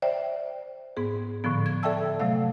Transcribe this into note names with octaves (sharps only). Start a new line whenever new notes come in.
C5 D5 E5 G5
G#2 B3 G#4
A2 D3 F3 B3
G#6
A4 D5 E5 G5 A5 E6
C3 F#3 A3 F5